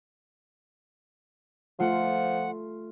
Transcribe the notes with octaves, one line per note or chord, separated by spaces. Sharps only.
F3 A3 F4 F#5